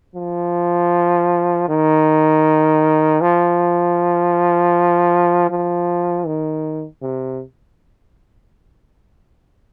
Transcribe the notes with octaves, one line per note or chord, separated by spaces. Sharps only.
F3
D#3
F3
F3
D#3
C3